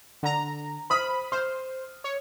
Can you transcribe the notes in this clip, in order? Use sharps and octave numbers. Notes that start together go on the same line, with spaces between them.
D3 A#5
C5 B5 D#6 F6
C5 F6
C#5